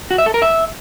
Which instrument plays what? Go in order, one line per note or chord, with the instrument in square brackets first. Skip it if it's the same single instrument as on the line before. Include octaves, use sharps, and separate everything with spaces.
[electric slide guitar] F#4
E5
A4
A#4
E5